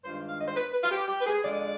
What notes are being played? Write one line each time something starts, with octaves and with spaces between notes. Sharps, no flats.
G2 D#3 G#3 D4 F4 C5
F5
D#5
C5
B4
B4
F4
G4
G4
B4
G#4
F2 D3 G#3 D5